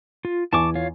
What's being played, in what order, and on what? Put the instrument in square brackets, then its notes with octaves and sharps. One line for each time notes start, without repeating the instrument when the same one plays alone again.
[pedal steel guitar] F4
[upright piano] E2 G#5 [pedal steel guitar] A5 C#6 D6
[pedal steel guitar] F4 C#5 F5